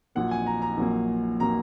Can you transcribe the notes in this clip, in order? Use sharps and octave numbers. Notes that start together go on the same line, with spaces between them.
A#1 A#2 F#3 A#3 F#5
G#5
A#5
A#5
A#1 A#2 F#3 A#3
A#2 F#3 A#3 A#5